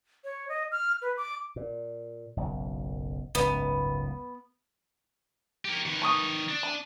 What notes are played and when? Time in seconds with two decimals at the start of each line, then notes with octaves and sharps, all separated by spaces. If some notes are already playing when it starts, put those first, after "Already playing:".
0.24 C#5
0.49 D#5
0.72 F6
1.02 B4
1.17 D6
1.56 A#2
2.37 F#1 B1
3.35 F#1 C#2 G#2 B3
5.65 G4 A#4
5.86 D#3 B4
6.02 A5 C#6 D#6
6.48 D4
6.63 A5